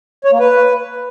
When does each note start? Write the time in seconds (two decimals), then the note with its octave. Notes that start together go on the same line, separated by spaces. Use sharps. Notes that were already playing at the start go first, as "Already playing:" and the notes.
0.24 C#5
0.32 A#3
0.40 B4